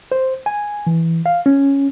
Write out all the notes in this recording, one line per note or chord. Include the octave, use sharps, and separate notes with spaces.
C5
G#5
E3
F5
C#4